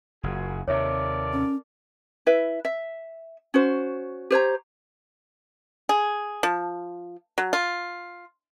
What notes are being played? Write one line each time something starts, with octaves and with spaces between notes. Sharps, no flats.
F#1 F4 F#4 G#4
D#2 C3 A4 A#4 C#5 D5 E5 D6
C#4
E4 B4 E5
E5
C#4 F#4 C5
G4 C5 C#5 A#5
G#4
F3
F#3
F4